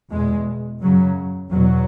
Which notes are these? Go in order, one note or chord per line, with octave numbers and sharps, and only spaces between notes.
E2 B2 G#3
F#2 C#3 F#3
E2 B2 F#3